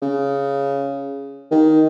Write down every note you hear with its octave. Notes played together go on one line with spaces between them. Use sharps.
C#3
D#3